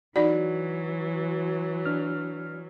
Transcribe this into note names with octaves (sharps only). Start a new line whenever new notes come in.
E3 F#3 D#4 F#4 D5
D4 F6